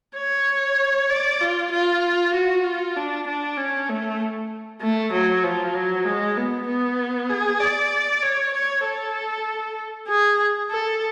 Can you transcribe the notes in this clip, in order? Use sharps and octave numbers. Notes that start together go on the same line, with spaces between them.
C#5
D5
F4
F4
F#4
F4
D4
D4
C#4
A3
A3
F#3
F3
F#3
G#3
B3
B3
G#4
D5
C#5
C#5
A4
G#4
A4